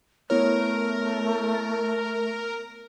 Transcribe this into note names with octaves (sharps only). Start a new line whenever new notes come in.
A3 B3 E4 A#4 C#5